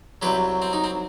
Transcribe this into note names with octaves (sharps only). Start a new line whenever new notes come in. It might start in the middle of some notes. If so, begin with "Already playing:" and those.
C2 C3 F#3 G4 B4
C4
D#4
C4